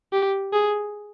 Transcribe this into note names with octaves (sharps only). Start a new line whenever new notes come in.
G4
G#4